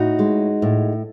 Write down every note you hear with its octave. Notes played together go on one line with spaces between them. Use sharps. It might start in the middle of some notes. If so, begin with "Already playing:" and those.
Already playing: A2 D#4 F#4
G#3
A2